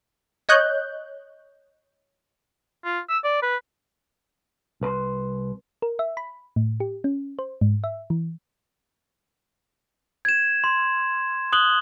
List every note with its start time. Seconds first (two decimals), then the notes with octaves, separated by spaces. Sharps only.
0.49 C#5 D#5 F#6 G6
2.84 F4
3.09 E6
3.24 D5
3.42 B4
4.81 C2 B4 A#5 C6
5.82 A#4
5.99 E5
6.17 B5
6.56 A2
6.80 G4
7.04 C#4
7.39 C5
7.61 G#2
7.84 E5
8.10 E3
10.25 G#6 E7
10.64 C6
11.53 D#6 F#6 F#7 G7